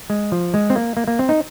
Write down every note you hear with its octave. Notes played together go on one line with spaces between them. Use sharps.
G#3
F3
G#3
C4
A#3
A#3
A#3
C4
D#4